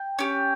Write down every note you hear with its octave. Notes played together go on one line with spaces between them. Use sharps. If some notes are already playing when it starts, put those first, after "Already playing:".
Already playing: G5
C#4 G4